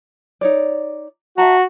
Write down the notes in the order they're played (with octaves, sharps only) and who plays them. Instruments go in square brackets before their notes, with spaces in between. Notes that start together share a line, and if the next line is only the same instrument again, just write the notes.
[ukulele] D#4 C#5 D5
[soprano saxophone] F#4 [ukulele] E5 A5 A#5